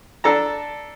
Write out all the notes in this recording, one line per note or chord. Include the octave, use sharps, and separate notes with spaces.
D4 A4 A5 A#5